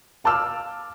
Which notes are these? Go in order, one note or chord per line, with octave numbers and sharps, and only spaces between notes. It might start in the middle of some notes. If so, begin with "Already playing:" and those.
F5 A5 D6 E6 F6